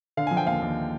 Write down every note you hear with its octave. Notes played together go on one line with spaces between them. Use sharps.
D3 F5
F3 G#5
G5
D#2 F5
D#2